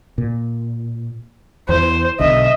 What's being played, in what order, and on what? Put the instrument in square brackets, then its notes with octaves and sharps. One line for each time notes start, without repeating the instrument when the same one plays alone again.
[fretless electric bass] A#2
[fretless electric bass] E2 E3 [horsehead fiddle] C5
[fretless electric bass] B1 B2 D3 [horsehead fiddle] D#5 E5